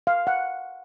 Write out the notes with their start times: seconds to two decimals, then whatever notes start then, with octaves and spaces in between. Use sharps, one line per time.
0.07 F5
0.27 F#5